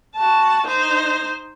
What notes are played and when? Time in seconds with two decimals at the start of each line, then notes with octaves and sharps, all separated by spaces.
0.15 F#4 A5
0.66 D#4 C5